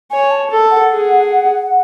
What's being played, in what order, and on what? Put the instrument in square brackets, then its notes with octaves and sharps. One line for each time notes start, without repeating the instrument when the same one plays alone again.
[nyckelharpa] C#5 [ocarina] G#5
[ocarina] A5
[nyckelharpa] A4
[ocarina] F#5
[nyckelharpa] G#4